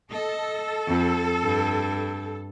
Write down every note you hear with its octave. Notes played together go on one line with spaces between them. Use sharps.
A4 D#5
F2
G2